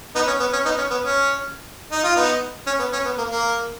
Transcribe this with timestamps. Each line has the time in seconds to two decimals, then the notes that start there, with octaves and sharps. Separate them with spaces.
0.15 B3 D#4
0.27 C#4
0.40 B3
0.53 C#4
0.65 B3 D#4
0.78 C#4
0.90 B3
1.03 C#4
1.92 D#4
2.04 F4
2.16 B3 D#4
2.67 C#4
2.79 B3
2.93 C#4
3.05 B3
3.18 A#3
3.30 A#3